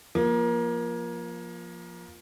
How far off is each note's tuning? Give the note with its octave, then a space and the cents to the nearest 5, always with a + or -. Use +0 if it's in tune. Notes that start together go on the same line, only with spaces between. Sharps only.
F3 +0 A#3 +25